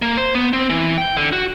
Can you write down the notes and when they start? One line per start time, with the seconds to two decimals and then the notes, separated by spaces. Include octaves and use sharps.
0.02 A#3
0.17 C5
0.35 B3
0.53 C4
0.70 E3
0.98 G5
1.17 D3
1.33 F#4